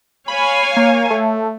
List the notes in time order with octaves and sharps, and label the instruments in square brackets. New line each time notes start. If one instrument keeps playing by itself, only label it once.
[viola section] C#5 F5 G#5 [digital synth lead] B5
[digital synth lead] A#3
A3